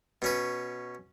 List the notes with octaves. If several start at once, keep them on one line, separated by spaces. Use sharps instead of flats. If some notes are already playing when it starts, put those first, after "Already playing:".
B2 C#4 B4